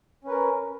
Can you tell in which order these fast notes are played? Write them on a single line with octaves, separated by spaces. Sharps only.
C#4 B4 A#4